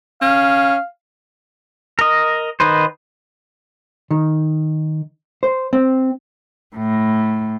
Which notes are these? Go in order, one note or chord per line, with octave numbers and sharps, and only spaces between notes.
C#4 F5
A#4 D#5
D#3 D#4 B4 C5
D#3
C5
C4
A2